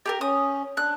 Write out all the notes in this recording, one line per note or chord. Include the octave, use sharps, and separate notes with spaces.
G4 G#4 A#4
C#4 D#6
D4 F#6